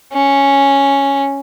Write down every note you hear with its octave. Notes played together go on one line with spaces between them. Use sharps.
C#4